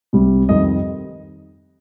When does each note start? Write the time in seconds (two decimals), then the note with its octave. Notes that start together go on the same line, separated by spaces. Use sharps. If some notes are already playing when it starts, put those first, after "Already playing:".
0.13 C2 C3 G3
0.49 F2 D#3 G3 D#5